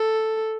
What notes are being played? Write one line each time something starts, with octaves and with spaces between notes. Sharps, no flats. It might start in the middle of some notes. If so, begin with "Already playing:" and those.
Already playing: A4